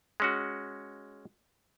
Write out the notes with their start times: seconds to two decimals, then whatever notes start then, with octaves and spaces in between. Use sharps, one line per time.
0.20 G#3 C#4 F#4